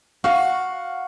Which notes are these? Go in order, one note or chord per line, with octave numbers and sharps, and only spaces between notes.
F#4 F5